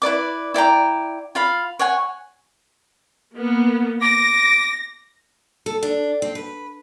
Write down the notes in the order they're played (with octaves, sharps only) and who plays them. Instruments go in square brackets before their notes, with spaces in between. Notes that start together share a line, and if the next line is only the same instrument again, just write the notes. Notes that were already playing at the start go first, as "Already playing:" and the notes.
[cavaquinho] E4 B4 D5 D6
E4 D5 G5 A#5
F4 F5 B5
C#5 F#5 G#5
[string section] A#3 B3
[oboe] D6 [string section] A#6
[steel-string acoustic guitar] A4
D4
C4
B4